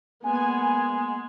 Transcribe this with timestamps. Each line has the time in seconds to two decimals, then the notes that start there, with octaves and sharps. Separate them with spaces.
0.24 G#3 A#3 B3 G#5